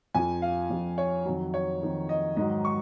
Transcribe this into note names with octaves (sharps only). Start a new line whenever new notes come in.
F2 F3 G#5
F5
F2 F3
C#5
F2 D#3 F#3
C#5
F2 D#3 F#3
D#5
G#2 D#3 F#3 D#5
C#6